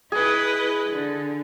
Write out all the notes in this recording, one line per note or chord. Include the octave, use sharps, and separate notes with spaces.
E4 G#4 B4 D#5
D3